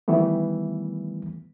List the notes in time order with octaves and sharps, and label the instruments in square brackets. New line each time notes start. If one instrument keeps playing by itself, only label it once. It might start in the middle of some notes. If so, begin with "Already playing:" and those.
[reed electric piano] D#3 E3 G3 A3 B3